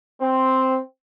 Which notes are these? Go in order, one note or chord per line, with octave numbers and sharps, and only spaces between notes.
C4